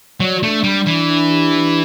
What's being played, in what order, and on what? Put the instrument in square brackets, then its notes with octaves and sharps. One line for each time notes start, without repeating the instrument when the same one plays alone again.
[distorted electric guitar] F#3 [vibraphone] D5
[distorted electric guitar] A3 [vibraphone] D4
[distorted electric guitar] G3 [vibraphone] D5
[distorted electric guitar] E3 [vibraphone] D4
[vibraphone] D4
G4
D4